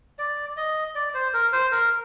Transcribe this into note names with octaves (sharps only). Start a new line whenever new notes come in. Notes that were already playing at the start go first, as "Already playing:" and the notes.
D5
D#5
D5
C5
A#4
C5
A#4